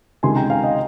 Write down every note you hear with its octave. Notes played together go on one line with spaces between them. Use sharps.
C#2 C3 D#3 G#5 C6
G5 A#5
F5 G#5
D#5 G5